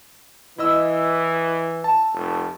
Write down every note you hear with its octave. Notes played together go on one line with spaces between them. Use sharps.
E3 E4 D#5 E6
A5
F1